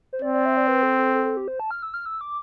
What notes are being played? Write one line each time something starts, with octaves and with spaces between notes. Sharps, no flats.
C5
C4 D5
D5
E5
D5
B4
A4
A4
A4
A4
G4
C5
A5
F6
E6
F6
E6
D6